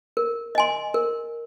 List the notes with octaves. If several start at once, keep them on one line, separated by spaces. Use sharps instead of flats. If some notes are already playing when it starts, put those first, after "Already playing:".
A#4
D#5 G#5 C6
A#4